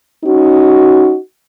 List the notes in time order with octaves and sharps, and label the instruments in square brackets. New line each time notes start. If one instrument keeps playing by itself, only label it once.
[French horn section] C#4 D#4 F#4